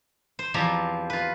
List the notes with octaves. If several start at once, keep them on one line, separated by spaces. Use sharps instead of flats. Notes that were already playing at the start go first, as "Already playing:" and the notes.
C5
E2 F3 C4 G4 A#5
F4 B4